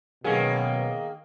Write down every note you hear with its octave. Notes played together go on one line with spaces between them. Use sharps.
B2 D#3 F#3 A#3 C#4 G#4